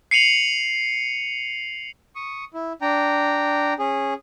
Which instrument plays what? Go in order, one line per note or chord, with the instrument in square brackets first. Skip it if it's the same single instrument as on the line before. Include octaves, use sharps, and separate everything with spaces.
[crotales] C7 C#7 D#7 F7 F#7
[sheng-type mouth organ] C#6 D#6
E4
D4 G5 A#5
C#4 G#4